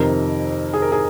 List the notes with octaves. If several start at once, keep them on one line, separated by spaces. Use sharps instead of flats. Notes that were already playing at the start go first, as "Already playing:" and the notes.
Already playing: F2 C3 D#3 A#4
G#4
A#4
G#4